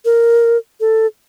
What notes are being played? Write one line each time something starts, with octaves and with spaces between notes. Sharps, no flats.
A#4
A4